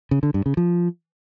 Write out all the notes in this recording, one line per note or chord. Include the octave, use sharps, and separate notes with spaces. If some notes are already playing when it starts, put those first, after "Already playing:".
C#3
D3
G2
C#3
F3